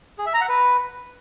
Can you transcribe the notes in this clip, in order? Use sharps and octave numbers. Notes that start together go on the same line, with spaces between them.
G#4
E5
A#5
F#5
B4